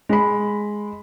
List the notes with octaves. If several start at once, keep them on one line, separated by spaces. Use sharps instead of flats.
G#3 B5